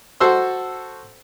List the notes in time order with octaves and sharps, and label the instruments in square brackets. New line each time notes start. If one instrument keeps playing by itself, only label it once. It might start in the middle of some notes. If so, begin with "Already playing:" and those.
[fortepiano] F#4 A4 C5 C6 E6